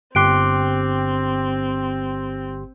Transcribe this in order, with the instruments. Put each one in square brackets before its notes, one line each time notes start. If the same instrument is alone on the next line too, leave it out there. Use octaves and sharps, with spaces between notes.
[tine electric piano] G1 G4 C6 [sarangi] C4 [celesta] D6 F#6 D7